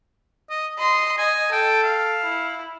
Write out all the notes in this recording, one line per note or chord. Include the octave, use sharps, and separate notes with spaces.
D#5
D#5 C6
D#5 G#5
A4 G5
F5
E4